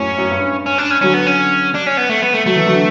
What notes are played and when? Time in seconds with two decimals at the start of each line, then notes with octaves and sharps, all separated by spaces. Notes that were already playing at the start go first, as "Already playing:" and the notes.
Already playing: F#2 A2 C#4
0.18 F#2
0.30 G2
0.66 C#4
0.78 D4
0.90 C#4
1.01 D3 F#3 C#4
1.14 B3
1.27 C#4
1.75 D4
1.86 C#4
1.97 B3
2.09 A3
2.22 B3
2.34 A3
2.46 F#3 A3
2.56 E3
2.66 D3 F#3